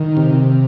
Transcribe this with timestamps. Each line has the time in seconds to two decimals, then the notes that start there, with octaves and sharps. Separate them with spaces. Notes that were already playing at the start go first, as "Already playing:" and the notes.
Already playing: D#3
0.17 C3